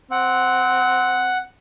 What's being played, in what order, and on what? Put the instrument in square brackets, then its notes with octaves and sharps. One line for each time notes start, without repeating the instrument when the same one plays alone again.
[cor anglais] C4 [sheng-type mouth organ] F#5